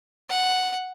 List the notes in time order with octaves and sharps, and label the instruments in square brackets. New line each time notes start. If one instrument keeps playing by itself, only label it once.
[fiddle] F#5